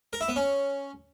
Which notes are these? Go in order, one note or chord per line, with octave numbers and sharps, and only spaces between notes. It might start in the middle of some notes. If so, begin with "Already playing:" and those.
A#4
E4
B3
C#4